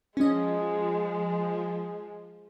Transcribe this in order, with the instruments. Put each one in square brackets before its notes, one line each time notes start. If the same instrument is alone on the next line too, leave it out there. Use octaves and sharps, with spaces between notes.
[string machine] F3 [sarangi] G#3 [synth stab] C#4 D#5